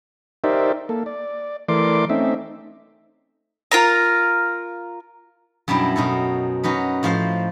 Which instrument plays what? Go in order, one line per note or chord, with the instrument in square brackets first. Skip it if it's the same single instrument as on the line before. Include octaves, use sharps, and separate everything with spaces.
[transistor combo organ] D#4 G4 A#4 C5 D5 E5
A#3 A4
D5
E3 A3 A#4 D5 C6 D6
A3 C4 C#4 D#4 E5
[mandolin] F4 A#4 A#5
[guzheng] F#2 B2 G3 D4 E4
B2 C#4 D#4 A4
F#3 C#4 D#4 B4
A2 F3 C5 F5 C6